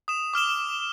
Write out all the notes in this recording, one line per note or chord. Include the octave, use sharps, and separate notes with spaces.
D#6 E7
D6 F6 E7 G7